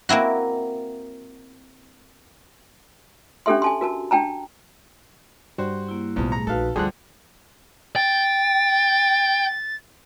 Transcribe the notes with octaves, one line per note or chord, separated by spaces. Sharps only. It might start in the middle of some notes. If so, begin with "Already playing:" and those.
A#3 C4 E4 F#4
C#4 D4 G4 A4 E5 C6
G#5 A5 C6
F#4 A#4 A5
D4 G5 A5 A#5
G2 G3 F#4 C5
A#3 E4
B1 E2 A2 F3
A3 G#4 A#5
A#1 D#4 F#4 A4 B4 F5
D2 G2 D3 F3 G3 G#4 C6 F#6
G5 A6